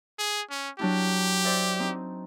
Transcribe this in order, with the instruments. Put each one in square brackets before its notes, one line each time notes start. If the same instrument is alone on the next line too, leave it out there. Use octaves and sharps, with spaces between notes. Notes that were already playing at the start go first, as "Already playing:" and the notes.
[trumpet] G#4
C#4
[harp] F#3 D4 E4 [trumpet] G4
[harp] C5 D5 E5
C4 D#4